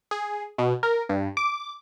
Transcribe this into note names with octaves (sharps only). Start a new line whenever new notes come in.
G#4
B2
A#4
G2
D6